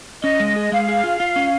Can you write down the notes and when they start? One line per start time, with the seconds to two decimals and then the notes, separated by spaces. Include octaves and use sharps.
0.23 C#4 D#5
0.40 G#3
0.56 G#4
0.72 G#3 F5
0.89 G#4
1.04 F4
1.20 F4
1.36 C#4